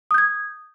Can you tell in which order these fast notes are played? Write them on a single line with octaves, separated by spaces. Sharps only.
D#6 G6 G#6